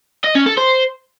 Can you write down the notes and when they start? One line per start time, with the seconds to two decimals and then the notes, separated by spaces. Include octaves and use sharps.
0.24 D#5
0.35 C#4
0.47 A4
0.58 C5